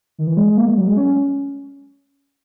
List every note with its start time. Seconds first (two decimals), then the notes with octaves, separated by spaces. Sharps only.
0.18 D#3
0.27 E3
0.37 G#3
0.48 G#3
0.57 A#3
0.67 G#3
0.78 F#3
0.87 G#3
0.97 C#4